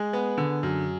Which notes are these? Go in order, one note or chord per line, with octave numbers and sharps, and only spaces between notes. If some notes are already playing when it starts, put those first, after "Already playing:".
Already playing: G#3 G#4
B3
D3
F#2